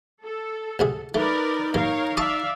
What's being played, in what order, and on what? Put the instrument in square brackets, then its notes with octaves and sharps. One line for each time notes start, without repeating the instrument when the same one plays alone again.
[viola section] A4
[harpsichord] D2 C3 G#4
[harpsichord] A3 [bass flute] D#4 [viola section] A#4 B4 D5
[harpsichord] G2 A#3 [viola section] A#4 C#5 F5
[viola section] D5 E5 F5 [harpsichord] A5 C#6 D#6